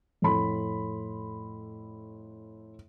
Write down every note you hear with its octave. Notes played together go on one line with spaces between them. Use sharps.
F2 A2 B5 C6